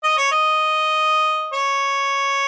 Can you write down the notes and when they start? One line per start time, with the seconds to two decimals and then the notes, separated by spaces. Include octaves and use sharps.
0.04 D#5
0.17 C#5
0.32 D#5
1.53 C#5